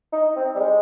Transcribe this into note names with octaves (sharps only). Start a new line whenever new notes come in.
D#4
C4
G3
G#3